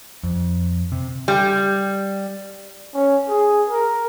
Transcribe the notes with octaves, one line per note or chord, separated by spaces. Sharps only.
F2
C3
G3
C#4
G#4
A#4